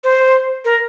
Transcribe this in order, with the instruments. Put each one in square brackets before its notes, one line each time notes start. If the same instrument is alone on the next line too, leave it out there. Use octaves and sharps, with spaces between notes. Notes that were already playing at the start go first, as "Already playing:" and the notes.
[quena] C5
A#4